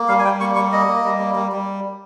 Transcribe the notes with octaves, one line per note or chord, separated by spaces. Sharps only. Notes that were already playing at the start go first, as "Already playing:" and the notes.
Already playing: A#3
G3 F5
G#5
G3 G5
A#3 C#6
G3 C#6
A#3 D#5
A#3
G3
A#3
G3
G3